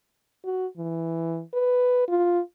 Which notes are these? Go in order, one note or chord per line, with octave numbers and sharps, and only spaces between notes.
F#4
E3
B4
F4